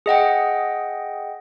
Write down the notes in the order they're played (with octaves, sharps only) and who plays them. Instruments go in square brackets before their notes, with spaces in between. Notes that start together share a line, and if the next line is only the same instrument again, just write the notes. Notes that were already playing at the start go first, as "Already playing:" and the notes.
[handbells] G#4 D#5 F#5 G5